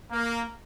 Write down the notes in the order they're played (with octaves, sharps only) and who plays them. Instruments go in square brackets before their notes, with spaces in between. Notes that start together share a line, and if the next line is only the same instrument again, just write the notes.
[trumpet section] A#3